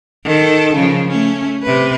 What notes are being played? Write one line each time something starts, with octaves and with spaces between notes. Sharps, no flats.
D#3 A4
C#3 F3
A3 C#4
C3 B4